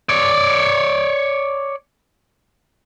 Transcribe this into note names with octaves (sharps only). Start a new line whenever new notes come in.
C#5 D5